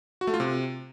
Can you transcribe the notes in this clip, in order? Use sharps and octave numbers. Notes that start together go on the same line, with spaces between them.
F#4
A3
F4
C3